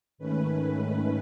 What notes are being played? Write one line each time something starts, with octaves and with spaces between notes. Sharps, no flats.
G#2 D#3 A3 C#4 B4